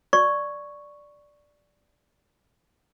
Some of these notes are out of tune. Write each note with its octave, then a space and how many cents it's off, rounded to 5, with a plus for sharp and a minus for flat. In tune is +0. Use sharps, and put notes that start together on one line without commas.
D5 +0 C#6 +0